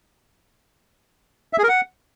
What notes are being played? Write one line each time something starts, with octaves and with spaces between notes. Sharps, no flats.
E5
G#4
A#4
F#5